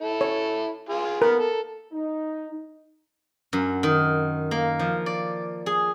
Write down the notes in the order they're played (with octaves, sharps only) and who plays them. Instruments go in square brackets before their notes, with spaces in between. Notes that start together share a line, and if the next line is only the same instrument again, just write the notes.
[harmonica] E4 A4
[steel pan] C#5
[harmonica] F4 G#4
[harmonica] B3 [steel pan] A#4
[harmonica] A4
[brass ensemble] D#4
[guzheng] F#2
D#3
A#3
F3
D5
G#4